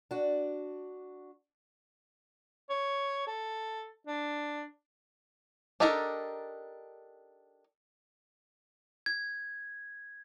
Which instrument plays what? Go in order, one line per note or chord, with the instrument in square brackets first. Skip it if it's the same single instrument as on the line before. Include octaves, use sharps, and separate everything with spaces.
[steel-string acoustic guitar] D4 F#4
[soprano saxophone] C#5
A4
D4
[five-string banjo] D4 D#4 G4 A4 A#4
[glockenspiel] G#6